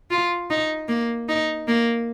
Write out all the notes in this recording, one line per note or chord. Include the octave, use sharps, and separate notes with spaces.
F4
D#4
A#3
D#4
A#3